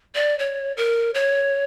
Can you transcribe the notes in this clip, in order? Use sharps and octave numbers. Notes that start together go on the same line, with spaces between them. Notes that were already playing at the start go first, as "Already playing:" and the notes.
D5
C#5
A#4
C#5